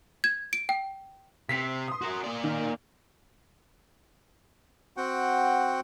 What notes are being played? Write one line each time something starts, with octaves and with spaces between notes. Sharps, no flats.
G#6
D7
G5
C3 B6 C7
C6 D#6
F#4 A#4
A#3 D5
D#3
C4 F#4 F#5 G5